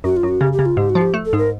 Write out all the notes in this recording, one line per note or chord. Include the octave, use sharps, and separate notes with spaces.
F#2 F#4
F4
F#2 F#4
C#3 G4
G4
C#3
F4
G#2 G4
F#4
F3
G4
A3
A4
G#2
A#4